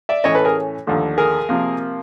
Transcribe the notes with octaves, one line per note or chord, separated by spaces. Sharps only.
D5 E5
A2 E3 A3 C#4 C#5 D#5
A4 B4
G#4 A#4
D#2 D3 F3 A3
G#4 A#4
C3 F3 A#3